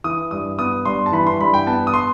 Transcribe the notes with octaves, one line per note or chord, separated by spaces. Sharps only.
E3 D#6
G2 D#6
B3 D#6
G2 C6
A5
E3 B5
C6
G2 B5
G5
B3 A5
D#6
C6